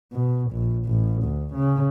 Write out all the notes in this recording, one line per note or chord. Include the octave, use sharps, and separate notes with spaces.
B2
A#1
A1
D2
C#3